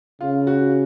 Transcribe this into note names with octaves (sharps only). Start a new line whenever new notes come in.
C#3 F4
F#4